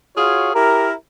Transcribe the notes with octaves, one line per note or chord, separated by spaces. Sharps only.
F4 F#4 G#4 C#5 F5
E4 G4 A#4